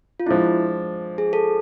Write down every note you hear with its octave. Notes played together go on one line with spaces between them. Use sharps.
F4
F3 G#3 D4 E4
G#4
A4